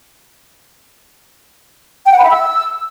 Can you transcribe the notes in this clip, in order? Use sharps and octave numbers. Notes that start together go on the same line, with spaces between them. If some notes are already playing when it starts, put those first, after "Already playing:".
G5
F#5
B5
E5
E6